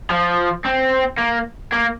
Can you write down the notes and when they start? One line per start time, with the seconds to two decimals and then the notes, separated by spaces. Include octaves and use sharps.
0.10 F3
0.65 C4
1.18 A#3
1.72 A#3